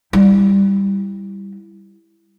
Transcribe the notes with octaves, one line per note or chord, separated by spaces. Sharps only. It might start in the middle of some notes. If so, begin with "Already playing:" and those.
G3 E4